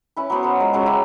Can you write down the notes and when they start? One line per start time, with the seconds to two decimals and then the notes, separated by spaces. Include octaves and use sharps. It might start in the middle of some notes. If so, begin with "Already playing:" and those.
0.17 C#4 E4 B4
0.30 F#3 B3 C5
0.43 A#4 F#5
0.59 G#3 F4
0.73 C#3 F#3 F5 G#5
0.86 E4 G4 A#5